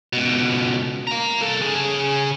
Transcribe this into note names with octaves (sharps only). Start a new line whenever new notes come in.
C#2 B2
F5 A#5
C2 A4
C#3 G#4